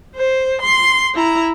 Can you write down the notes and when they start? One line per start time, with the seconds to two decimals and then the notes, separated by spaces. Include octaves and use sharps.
0.16 C5
0.62 C6
1.15 E4 A#5